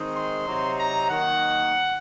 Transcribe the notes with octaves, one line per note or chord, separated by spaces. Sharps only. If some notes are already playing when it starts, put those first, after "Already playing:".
Already playing: D#3 G#3 C4 D#4
C6
C3 F#3 C4 D#4
A#5
D#3 F#3 A#3 D#4 F#5